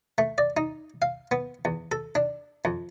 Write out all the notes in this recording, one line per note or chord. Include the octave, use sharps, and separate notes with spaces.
A3
D5
D#4
F5
B3
E2
A4
D4
F2